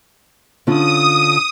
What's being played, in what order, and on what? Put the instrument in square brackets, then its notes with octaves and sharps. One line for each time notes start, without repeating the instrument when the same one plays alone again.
[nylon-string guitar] D3 C#4 F4 [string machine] D#6